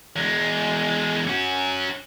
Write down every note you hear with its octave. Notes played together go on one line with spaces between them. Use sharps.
E2 G#3
C#4 F#4